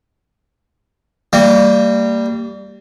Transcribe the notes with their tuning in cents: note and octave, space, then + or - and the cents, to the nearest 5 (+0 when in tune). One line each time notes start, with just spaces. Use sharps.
G3 +0 A#3 -30